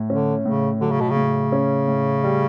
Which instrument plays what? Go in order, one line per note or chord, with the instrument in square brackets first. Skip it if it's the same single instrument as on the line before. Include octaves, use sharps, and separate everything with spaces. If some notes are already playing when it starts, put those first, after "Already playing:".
Already playing: [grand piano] A2
[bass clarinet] D3 [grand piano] C#4
[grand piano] A2 [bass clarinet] C#3
[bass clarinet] D3 [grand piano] F#3
[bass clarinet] C#3
B2
C#3
[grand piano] A2
C#4
A2
G3